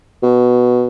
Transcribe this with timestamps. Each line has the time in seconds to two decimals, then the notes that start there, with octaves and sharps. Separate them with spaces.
0.22 B2